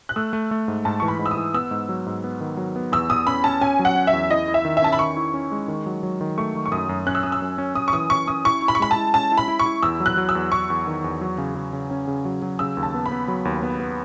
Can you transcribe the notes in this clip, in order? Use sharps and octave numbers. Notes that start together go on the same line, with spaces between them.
F#6
A3 E6
A3
A3
G#2
G#2 A5
E3 C#6
B5
G#2
E6
D#6
E3
B3 E6
G#2
F#3
G#2
B3
D#3
F#3
B3
E2 E6
E2 D#6
C#4 B5
C#4 A5
C#4 G#5
F#3
F#5
C#4
E5
E2
E4 D#5
E4
E5
D#3
E5
C#4 A5
B5
D#3 C#6
E4
C#4
G#3
D#3
F#3
F#3
D#3
A3 C#6
D#3
C#6
F#2 D#6
F#2
C#4 F#6
E6
C#4 D#6
E6
F#2
C#4
C#4 D#6
C#6
E3 D#6
C#4 C#6
C#4 D#6
E4 C#6
E4
B5
C#6
G#3 B5
A5
E4
C#4 A5
E4
B5
E4
C#6
E4
E2 E6
F#3
F#6
F#3
E6
E2
E2 C#6
E2
D#3
E2
F#3
C#3
C#3
C#3
C#4
C#3
F#3
F#3
C#3 E6
D#2
A5
B3
B5
B3
F#3
D#2
B3
B3